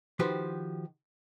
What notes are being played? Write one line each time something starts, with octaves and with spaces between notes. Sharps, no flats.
D#3 F3 F#4 G4 B4 C5